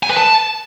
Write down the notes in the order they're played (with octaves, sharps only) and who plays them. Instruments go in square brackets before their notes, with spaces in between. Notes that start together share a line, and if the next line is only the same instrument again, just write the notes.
[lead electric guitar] G#5
B4
A5